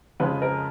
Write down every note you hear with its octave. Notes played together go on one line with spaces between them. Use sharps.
F2 C#3 G#3 B4
A#4